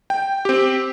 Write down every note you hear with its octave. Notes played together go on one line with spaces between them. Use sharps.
G5
C4 G4